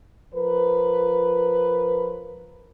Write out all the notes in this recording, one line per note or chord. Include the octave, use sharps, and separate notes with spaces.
F3 A#4 B4